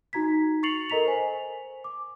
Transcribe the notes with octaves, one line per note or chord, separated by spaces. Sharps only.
D#4 F#4 A#5 G#6 B6
C#6 A6 C7 C#7 F7 F#7
A4 A#4 D#5 A#5 B6 F7
C5 G#5
D6